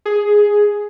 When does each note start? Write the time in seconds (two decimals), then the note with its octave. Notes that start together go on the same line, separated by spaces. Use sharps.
0.06 G#4